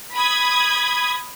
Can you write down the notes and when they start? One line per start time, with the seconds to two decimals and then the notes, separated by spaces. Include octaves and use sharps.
0.15 B5 D#6 G#6